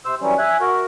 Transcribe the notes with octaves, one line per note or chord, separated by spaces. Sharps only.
C3 C5 E6
E3 F#3 G3 C#4
E5 G#5 F#6
F#4 A#4